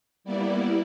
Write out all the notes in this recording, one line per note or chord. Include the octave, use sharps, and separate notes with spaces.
G3 A#3 B3 E4 D5